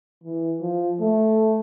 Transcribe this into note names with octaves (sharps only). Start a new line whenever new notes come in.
E3
F3
A3